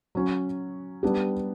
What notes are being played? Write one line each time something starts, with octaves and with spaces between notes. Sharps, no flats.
F#3 C#4 F#4
G3 B3 D4 G4